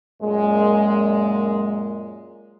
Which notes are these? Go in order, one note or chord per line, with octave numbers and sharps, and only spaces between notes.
F#2 A#2 G#3